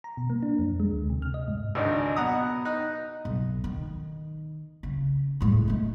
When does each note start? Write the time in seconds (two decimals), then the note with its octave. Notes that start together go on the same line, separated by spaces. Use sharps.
0.04 A#5
0.17 B2
0.30 A#3
0.43 D4
0.59 F2
0.80 G#3
0.92 D2
1.10 C3
1.22 F6
1.34 D#5
1.48 G#2
1.75 G#1 C#2 D4 D#4
2.16 B2 F#5 A#5 D#6
2.65 D#4 F#6
3.25 B1
3.64 D#3
4.83 C#3
5.41 A2 G#3
5.68 A3 D#4